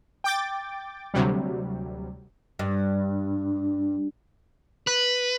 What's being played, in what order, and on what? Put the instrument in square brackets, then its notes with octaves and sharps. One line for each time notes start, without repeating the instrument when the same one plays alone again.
[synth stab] G5 D6 A6
D2 C3 F#3 G3
[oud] G2
[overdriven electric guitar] B4